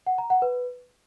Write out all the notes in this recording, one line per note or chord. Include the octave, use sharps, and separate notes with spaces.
F#5
A#5
F#5
B4